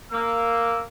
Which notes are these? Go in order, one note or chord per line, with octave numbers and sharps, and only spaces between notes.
A#3 E6